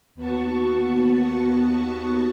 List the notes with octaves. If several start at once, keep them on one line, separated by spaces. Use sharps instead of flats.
D#2 B3 F#4 A5 C#6